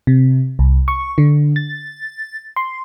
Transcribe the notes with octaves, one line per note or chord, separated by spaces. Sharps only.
C3
C2
C#6
D3
A6
C6